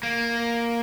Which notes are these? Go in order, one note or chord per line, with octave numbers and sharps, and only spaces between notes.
A#3